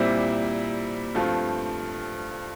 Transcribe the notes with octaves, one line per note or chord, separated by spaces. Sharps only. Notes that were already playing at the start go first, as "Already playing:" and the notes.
Already playing: A#2 G3 C4 E4
G2 F3 A3 C4 F4